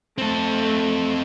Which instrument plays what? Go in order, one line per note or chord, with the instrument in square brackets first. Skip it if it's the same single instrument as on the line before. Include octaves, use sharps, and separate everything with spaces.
[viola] A3 [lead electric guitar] C4 A4